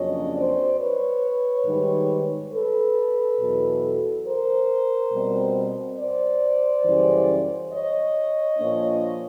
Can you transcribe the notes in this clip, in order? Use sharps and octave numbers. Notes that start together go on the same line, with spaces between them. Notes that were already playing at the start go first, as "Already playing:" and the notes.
Already playing: F2 C#3 F#3 A#3 D4 C#5 D#5
C5 D5
B4 C#5
G#2 D#3 G3
A4 B4
E2 B2 F#3
A#4 C5
B2 G3 C4
C5 D5
F#2 C#3 E3 G3
C#5 D#5
A#2 F3 A#3 D4